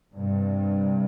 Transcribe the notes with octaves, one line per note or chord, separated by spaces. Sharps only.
G2 C3